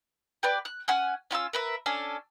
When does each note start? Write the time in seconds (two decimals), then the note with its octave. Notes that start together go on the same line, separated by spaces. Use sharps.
0.43 G4 B4 D5
0.65 F#6
0.88 C#4 F#5 G#5
1.31 C#4 F4 B5 E6
1.53 A#4 B4 E5
1.86 C#4 D4 A4 G#5